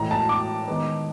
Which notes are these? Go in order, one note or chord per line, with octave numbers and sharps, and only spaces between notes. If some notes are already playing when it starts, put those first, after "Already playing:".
Already playing: A2 E3 G#3 A#5
A5
D6
D#3 G#3 B3